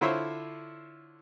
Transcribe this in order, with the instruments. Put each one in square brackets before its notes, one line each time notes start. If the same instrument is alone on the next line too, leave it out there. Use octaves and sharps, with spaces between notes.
[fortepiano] D3 E4 F4 C5 C#5 E5